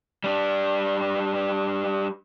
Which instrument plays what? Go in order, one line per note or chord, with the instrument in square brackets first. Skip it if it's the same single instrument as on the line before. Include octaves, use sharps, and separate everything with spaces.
[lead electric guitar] G3 D4